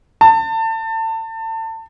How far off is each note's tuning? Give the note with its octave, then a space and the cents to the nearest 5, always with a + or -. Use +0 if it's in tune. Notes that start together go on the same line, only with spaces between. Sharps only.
A5 +30